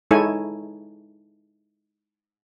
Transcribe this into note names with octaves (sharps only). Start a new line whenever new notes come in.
G#3 D#4 E4 A4 C#5 G#5